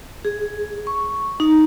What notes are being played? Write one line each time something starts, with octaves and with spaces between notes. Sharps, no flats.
G#4
C#6
D#4